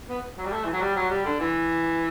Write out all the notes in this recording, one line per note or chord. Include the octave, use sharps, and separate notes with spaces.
B3
F#3
G3
A3
E3
F#3
G3
F#3
G3
D3
E3